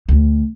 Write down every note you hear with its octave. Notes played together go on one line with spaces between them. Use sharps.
D2